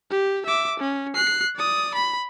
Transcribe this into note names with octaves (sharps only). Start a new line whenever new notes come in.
G4
E5 D6
C#4
F#6 C7
D5 D#6
B5